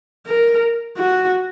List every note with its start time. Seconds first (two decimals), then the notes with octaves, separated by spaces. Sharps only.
0.27 A#4
0.97 F#4